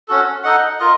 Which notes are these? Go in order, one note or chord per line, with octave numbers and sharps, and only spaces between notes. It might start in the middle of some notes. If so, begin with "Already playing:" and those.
C#4 F#4 A4
D#4 A4 D#5 F#5
F4 A#4 D#5